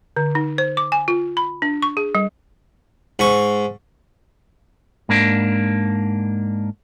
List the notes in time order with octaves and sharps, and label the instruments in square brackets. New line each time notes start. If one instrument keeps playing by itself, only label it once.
[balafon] D3
D#4
C5
D6
G#5
F4
B5
D4
C#6
G#4
G3
[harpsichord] G#2 C#6
[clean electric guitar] G#2 A#3 D4